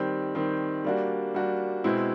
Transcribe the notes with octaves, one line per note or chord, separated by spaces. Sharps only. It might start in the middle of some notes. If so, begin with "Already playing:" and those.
Already playing: D#3 G3 C4
D#3 G3 C4
G3 A#3 D4 F#4
G3 A#3 D4 F#4
B2 G#3 C4 E4